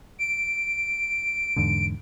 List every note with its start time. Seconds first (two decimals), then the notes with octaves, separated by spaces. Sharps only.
0.19 D7
1.57 E2 G#2 D3